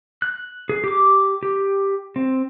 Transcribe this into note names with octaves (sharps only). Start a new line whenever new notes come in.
F#6
G#4
G4 D6
G4
C4